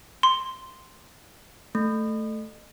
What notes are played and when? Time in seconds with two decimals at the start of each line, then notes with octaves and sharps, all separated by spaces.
0.23 C6
1.75 A3